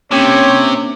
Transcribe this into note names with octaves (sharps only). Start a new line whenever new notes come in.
C3 A#3 C#4 D4 G4 C#5